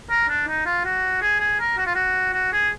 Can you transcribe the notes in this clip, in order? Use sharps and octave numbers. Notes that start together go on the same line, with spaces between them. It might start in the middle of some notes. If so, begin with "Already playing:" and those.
A#4
D4
D#4
F4
F#4
G#4
G#4
A#4
F#4
F4
F#4
F#4
G#4